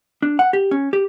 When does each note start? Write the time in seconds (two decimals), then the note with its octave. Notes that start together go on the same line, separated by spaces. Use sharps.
0.22 D4
0.39 F#5
0.53 G4
0.71 C#4
0.93 G4